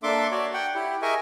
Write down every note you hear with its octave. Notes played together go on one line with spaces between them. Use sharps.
A#3 D4 A4 E5 C6 D6
F#4 C#5 D5
F#5 G5
E4 G4
G#4 A#4 D#5 E5 G#5 C#6